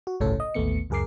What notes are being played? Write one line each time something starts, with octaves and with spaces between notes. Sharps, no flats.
F#4
G1 C2 A2 C#3 C#4 A4
D#5
A1 D#2 A3 B3 C#7
C#2 F#2 G#4 A#4 D6 C7